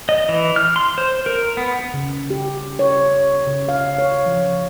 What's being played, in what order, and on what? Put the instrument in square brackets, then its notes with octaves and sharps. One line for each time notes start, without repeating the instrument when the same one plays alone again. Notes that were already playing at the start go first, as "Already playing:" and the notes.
[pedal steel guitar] D#5
E3
F6
C6
C5
A#4
B3
[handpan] C#3
G4
C#5
C#3
F5
C#5
F3